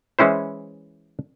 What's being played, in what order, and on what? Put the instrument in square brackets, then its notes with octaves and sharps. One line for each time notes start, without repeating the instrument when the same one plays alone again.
[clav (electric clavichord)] E3 G#3 C#4 E4 C5